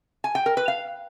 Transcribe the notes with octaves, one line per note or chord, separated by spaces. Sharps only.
G#5
G5
A#4
B4
F5